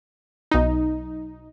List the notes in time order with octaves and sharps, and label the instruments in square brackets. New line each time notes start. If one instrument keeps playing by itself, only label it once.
[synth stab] B1 D#4